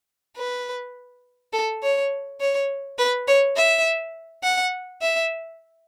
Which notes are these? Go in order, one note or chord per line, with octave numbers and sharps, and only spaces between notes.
B4
A4
C#5
C#5
B4
C#5
E5
F#5
E5